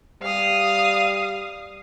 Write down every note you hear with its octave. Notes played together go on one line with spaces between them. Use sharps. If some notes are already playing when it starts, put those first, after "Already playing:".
G3 F5 D#6